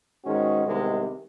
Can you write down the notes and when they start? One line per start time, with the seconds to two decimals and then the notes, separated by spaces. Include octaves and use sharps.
0.24 G#2 D#3 G#3 C#4 F#4
0.66 C2 C3 D#3 G#3 B3